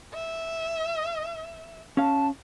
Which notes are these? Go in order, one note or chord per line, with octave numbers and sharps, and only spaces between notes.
E5
C#4 F5 A5